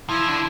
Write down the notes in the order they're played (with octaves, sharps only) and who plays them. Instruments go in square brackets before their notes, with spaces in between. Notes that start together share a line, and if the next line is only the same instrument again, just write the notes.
[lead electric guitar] F3 [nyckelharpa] E4
[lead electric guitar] D3